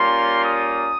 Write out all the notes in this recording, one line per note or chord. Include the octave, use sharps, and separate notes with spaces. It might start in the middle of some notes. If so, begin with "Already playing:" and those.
Already playing: G3 A#3 C#4 F4 C6
D#6